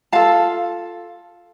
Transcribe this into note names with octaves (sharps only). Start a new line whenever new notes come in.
F4 A4 F5 A5